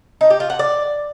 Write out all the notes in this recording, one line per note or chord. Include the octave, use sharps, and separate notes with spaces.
D#4
G4
F4
F#5
D5